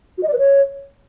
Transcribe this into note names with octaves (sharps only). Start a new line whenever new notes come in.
F#4
D#5
D5
B4
C#5